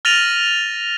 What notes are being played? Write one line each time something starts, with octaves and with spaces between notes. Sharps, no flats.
F6 A6 A#6 D#7 F7 F#7